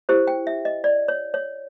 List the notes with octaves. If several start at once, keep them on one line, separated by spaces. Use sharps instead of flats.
E4 G4 C5
G5
E5
D#5
D5
C#5
C#5